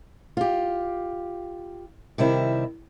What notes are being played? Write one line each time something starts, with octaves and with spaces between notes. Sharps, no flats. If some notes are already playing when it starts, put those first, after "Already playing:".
F4 G4
C3 D#3 G3 C4 E4